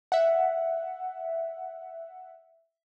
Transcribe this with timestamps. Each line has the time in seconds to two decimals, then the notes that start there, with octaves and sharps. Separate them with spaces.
0.12 E5 F#5